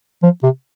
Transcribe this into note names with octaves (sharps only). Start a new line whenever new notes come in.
F3
C3